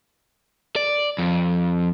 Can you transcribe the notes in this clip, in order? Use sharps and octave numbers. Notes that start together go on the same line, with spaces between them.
D5
F2